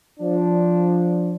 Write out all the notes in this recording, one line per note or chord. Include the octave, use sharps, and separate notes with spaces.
F3 D4